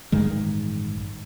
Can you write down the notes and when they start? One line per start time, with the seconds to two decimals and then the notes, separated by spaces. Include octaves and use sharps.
0.12 A1 G2 D#3 G#3